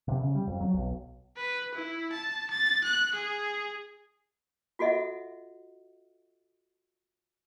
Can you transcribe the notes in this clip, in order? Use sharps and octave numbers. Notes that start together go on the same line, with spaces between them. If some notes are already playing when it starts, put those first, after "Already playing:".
C3
C#3
G3
F2
F#3
B1
B4
E4
A5
A6
F#6
G#4
F4 F#4 A4 D#5 E5 F#5